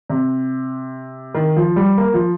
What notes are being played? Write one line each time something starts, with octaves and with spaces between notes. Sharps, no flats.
C3
D#3
F3
G3
A#3
F3